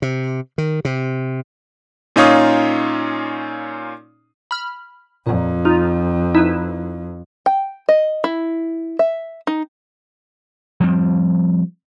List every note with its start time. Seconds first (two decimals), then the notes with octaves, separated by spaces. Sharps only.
0.02 C3
0.58 D#3
0.85 C3
2.16 A#2 C#4 D#4 F4 C#5 D#6
4.51 B5 F6
5.27 F2 A#2
5.65 D#4 F4
6.35 D#4 E4 B4
7.46 G5
7.89 D#5
8.24 E4
8.99 E5
9.47 D#4
10.80 F3 G3 C4